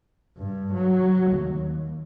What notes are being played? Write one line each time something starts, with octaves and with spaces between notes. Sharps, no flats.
G2
F#3
D#2